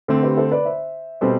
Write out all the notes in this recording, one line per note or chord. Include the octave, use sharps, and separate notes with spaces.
D3 A3 C4 A4 C5
G4 B4
A4 C5
B4 D5
C5 E5
B2 G3 C4 A4 C5